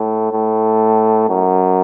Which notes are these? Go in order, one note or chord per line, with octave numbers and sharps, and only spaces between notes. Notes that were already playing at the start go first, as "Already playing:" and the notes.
Already playing: A2
A2
F#2